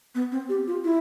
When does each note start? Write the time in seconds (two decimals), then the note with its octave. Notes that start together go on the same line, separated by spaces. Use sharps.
0.15 B3
0.32 C4
0.49 G4
0.67 F4
0.85 E4